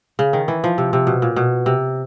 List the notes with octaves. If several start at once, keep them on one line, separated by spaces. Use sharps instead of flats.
C#3
D#3
E3
F3
C3
C3
B2
A#2
B2
C3